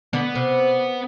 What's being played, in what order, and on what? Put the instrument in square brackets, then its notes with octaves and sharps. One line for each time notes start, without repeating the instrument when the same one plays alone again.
[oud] D3 [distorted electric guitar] B3
[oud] C3